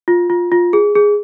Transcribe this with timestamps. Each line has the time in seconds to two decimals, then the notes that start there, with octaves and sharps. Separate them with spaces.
0.08 F4
0.30 F4
0.52 F4
0.73 G#4
0.95 G#4